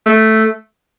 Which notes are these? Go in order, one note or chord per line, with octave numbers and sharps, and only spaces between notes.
A3